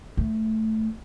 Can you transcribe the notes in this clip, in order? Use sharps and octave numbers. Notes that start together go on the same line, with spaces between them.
A3